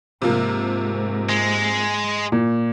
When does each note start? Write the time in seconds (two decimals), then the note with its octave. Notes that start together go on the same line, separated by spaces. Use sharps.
0.22 G#2 C3 F3 A#3
1.29 G#3
2.32 A#2